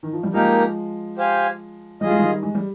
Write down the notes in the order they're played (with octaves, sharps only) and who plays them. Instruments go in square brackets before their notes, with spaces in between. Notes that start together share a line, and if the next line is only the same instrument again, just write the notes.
[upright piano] D#3
F3
G3
[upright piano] F3 G#3 [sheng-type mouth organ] A#3 D#4 G4 A#4
[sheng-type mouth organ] G4 C5 F5 G#5
[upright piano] G3 [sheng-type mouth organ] F4 G#4 D#5
[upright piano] G#3
D#3 G3
G#3
G3